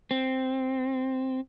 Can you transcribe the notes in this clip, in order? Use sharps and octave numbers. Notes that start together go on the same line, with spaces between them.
C4